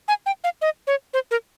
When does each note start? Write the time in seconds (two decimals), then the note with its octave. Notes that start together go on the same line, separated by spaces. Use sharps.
0.08 G#5
0.26 G5
0.44 F5
0.61 D#5
0.87 C#5
1.14 C5
1.31 A#4